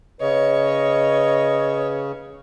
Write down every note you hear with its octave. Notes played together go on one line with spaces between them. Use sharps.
C#3 B4 C#5 D#5